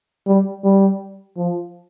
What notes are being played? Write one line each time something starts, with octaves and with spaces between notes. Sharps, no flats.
G3
G3
F3